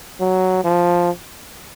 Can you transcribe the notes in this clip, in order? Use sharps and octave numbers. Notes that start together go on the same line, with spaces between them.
F#3
F3